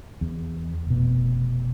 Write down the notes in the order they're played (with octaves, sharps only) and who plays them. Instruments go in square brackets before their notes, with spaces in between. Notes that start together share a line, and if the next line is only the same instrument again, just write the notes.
[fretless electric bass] E2
F1 B2